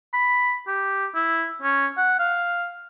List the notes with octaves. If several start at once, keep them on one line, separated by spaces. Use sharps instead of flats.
B5
G4
E4
C#4
F#5
F5